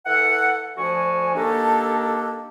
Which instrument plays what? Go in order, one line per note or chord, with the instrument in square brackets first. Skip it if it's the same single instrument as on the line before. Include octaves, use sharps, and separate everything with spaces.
[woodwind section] E3 A4 F#5
D2 F3 F#4 G#5
D#3 A#3 D4 G4 A4